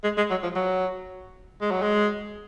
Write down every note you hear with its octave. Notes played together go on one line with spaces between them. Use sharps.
G#3
G#3
F#3
F3
F#3
G#3
F#3
G#3